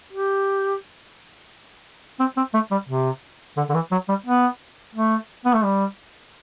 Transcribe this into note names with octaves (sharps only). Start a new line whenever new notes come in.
G4
C4
C4
A3
G3
C3
D3
D3
E3
F#3
G3
B3
A3
B3
A3
G3